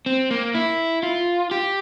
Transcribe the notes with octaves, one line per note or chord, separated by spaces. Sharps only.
C4
A#3
E4
F4
G4